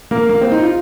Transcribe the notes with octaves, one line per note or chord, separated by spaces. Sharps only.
A#3 A#4
A#3
C4
D#4
F4